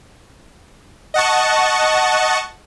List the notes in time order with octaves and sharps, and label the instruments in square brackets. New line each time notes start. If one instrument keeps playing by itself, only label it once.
[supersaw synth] D#5 F#5 A5 C#6